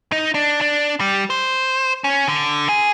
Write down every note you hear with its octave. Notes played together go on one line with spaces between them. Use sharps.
D#4
D4
D4
G3
C5
C#4
D3
G#4